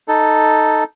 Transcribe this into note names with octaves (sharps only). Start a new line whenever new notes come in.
D#4 A4